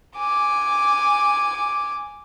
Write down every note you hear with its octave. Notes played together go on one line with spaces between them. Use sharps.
G#5 D6